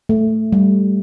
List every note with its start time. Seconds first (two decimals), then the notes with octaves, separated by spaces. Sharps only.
0.09 A3
0.52 G3